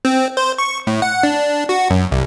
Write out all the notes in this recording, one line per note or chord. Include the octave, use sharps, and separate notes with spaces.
C4
C5
C#6
A2
F#5
D4
F#4
F#2
C2